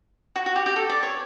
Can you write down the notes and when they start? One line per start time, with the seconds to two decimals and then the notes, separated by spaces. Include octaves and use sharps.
0.36 F#4
0.46 F#4
0.56 G4
0.66 G4
0.76 A4
0.89 D5
1.03 C#5